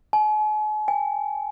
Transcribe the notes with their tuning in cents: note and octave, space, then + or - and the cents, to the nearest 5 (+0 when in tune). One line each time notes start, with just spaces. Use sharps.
G#5 +45
G#5 -45